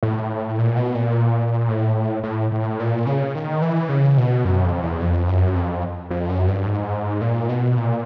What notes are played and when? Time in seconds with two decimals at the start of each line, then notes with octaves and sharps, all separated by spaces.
0.03 A2
0.58 A#2
0.77 B2
0.95 A#2
1.68 A2
2.23 A2
2.52 A2
2.79 A#2
3.06 C#3
3.35 D#3
3.62 E3
3.89 C#3
4.18 B2
4.45 F#2
4.64 F2
4.82 E2
5.01 F2
5.28 F#2
5.55 F2
6.10 F2
6.29 F#2
6.48 G2
6.67 G#2
7.21 A#2
7.49 B2
7.77 A#2